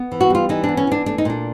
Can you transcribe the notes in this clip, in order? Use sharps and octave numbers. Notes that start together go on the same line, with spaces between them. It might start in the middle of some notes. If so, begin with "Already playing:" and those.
Already playing: B3
E3
F#4
G3 F4
E3 D#4
D4
B3
C#4
E3 D4
A3 D4
D#4
A#2 D4